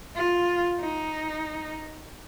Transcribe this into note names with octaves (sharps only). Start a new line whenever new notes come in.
F4
D#4